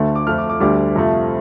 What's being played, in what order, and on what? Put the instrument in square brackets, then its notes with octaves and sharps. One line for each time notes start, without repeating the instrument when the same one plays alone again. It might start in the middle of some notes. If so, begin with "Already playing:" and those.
Already playing: [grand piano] D2 D3 A3
D6
F2 F3 A3 F6
D6
D6
D2 D3 G3 D6
F2 C3 F3 A3